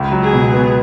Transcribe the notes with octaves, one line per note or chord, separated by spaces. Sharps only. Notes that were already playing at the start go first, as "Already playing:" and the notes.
Already playing: C#2
F#3
G#4
B2
B3